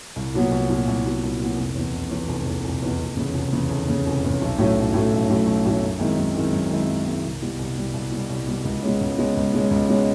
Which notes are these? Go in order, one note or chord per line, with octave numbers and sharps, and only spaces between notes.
C2
A#2 F#3 B3
C2
A#2 F#3 B3
C2
A#2 F#3 B3
C2
A#2 F#3 B3
F1
E2 B2
F1
E2 B2
F1
E2 B2
F1
E2 B2
F1
E2 C#3
F1
E2 C#3
F1
E2 C#3
F1
E2 C#3
B1
A2 F#3 A3 C#4
B1
A2 F#3 A3 C#4
B1
A2 F#3 A3 C#4
B1
A2 F#3 A3 C#4
F#2
D#3 G#3 C4 E4
F#2
D#3 G#3 C4 E4
F#2
D#3 G#3 C4 E4
F#2
D#3 G#3 C4 E4
C2
B2 G3
C2
B2 G3
C2
B2 G3
C2
B2 G3
C#2
B2 G#3 C#4
C#2
B2 G#3 C#4
C#2
B2 G#3 C#4
C#2
B2 G#3 C#4